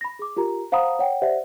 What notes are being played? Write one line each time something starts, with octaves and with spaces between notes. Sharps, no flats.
B5 A#6
G#4 D6
F4 G4 A#4 A#5
C5 F5 F#5 A#5 B5 D#6
C#5 F#5 G5
G4 C5 D5 E5 F#5